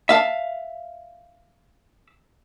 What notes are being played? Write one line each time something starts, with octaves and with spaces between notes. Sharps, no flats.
E5 F5 A5